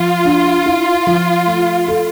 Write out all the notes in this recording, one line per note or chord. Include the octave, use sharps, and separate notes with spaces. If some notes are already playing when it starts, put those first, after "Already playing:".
Already playing: F3 F4
D4
E4
F3
A3
A4